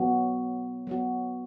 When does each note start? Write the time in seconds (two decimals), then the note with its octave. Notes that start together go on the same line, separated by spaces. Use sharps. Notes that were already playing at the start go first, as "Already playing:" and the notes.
Already playing: F#3 B3 F#4
0.87 F#3 B3 F#4